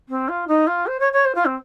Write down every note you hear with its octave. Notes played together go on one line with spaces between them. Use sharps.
C4
F4
D#4
F4
C5
C#5
C#5
C5
F4
C4